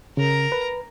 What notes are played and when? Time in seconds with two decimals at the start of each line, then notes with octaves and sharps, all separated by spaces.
0.17 C#3 A#4 A#5
0.52 B4